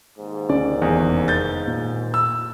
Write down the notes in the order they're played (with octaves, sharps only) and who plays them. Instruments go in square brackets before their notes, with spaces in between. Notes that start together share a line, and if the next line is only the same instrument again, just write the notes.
[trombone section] D#2 G#2
[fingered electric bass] D2 C#4 [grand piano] D5
[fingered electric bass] F1 [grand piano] E2
[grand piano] G6 A6
[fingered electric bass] A#2
[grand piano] E6